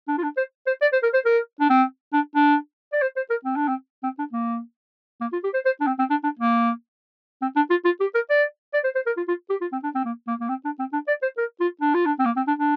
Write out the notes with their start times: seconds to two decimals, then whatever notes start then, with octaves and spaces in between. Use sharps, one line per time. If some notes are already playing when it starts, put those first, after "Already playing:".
0.08 D4
0.18 F4
0.23 D4
0.37 C5
0.67 C5
0.82 D5
0.93 C5
1.03 A#4
1.14 C5
1.25 A#4
1.60 D4
1.70 C4
2.13 D4
2.35 D4
2.93 D5
3.02 C5
3.17 C5
3.30 A#4
3.45 C4
3.56 D4
3.68 C4
4.03 C4
4.19 D4
4.33 A#3
5.21 A#3
5.33 F4
5.44 G4
5.54 C5
5.66 C5
5.80 D4
5.87 C4
5.99 C4
6.10 D4
6.24 D4
6.39 A#3
7.42 C4
7.56 D4
7.70 F4
7.85 F4
8.01 G4
8.15 A#4
8.30 D5
8.74 D5
8.84 C5
8.95 C5
9.07 A#4
9.17 F4
9.28 F4
9.50 G4
9.61 F4
9.72 C4
9.84 D4
9.95 C4
10.05 A#3
10.27 A#3
10.41 A#3
10.49 C4
10.65 D4
10.79 C4
10.93 D4
11.08 D5
11.22 C5
11.38 A#4
11.60 F4
11.81 D4
11.94 F4
12.06 D4
12.19 C4
12.26 A#3
12.37 C4
12.48 D4
12.59 D4